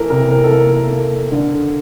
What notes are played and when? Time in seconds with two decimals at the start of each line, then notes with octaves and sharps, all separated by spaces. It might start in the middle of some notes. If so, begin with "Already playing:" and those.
Already playing: E3 A4 A#4
0.10 C3 A#4
0.31 A#4
0.44 A4
0.51 A#3 A#4
0.91 A#3
1.32 D3